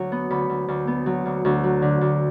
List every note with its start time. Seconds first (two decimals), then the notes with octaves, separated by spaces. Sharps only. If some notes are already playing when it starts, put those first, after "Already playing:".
Already playing: D2 F#3
0.12 B3
0.30 D2 B5
0.49 D2
0.68 D2
0.88 B3
1.06 F#3
1.26 D2
1.45 D2
1.64 F#3
1.82 D3
2.01 D2